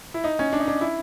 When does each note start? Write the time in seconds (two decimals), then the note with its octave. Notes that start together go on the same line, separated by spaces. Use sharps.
0.14 E4
0.24 D#4
0.39 C#4
0.53 D4
0.60 D#4
0.68 D4
0.81 E4